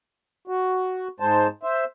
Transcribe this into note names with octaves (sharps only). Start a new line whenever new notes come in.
F#4
G#2 G#3 C5 A5
C5 E5